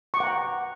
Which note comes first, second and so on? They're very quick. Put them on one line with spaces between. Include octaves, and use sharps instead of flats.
C#6 D6 F#5 A#5 G5